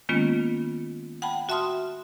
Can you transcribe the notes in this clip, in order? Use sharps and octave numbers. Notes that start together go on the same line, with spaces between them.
D#3 G#3 A#3 B3 C#4 F4
F#5 G5 A5 B5
F#4 E5 A5 C6 D#6 F6